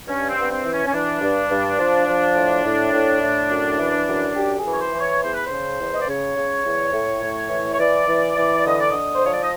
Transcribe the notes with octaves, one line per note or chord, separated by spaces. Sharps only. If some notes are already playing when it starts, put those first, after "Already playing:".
G2 C#4
C4
G2 B3
C4
E3
C#4
C#4
E3 D4
G2
G2
F3
F3
A2
A2
A2
A2
F#2
E3
F#2
F#2 G4
G#4
E3
C#5
C5
E3
C#5
E2 C5
B4
C5
C#3
E2
D#5
D5
C#3 C#5
C#3
E2
A2
A2
E3
C#5
E3 D5
E3
E3
D3 D#5
D5
D3 D#5
C5
F3 C#5
D5
D#5